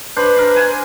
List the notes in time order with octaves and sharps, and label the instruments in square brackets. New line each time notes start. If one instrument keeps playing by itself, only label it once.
[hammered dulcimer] D4 C5 [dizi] B4
[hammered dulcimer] D4 A#4
G#5